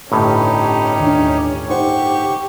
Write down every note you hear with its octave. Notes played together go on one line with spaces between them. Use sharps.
G1 A2 C#4 D#4 G4
D#2 D4
D#4 G4 C5 F#5 C#6